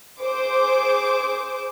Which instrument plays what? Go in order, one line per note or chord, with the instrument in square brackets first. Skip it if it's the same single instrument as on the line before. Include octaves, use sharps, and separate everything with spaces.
[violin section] G#4 C5 D6